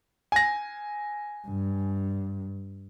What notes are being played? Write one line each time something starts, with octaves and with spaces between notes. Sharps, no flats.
G#5 A#6
G2